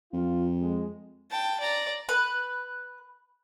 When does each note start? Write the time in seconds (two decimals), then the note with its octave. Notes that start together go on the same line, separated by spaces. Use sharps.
0.13 F2 F4
0.60 G#3
1.31 G5 A5
1.60 D5 A#5
2.09 B4